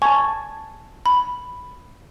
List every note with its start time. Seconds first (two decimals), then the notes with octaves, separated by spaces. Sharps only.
0.02 G#5 A5 C#6
1.06 B5